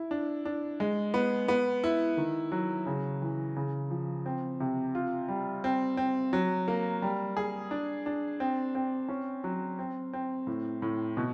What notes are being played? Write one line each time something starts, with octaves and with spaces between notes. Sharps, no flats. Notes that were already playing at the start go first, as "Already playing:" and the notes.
Already playing: E4
D4
D4
G#3
B3
B3
E4
D#3
F#3
C#3
E3
C#3
F3
C4
C3
F4
G3
C4
C4
F#3
A#3
G3
G#4
D4
D4
C4
C4
C#4
F#3
C4
C4
A2
A2
B2